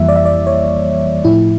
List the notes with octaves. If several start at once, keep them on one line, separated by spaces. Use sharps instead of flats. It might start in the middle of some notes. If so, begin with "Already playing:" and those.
Already playing: F2 E3 G3 A#3 E5
D5
E5
D5
C#5
A2 F3 A3 E4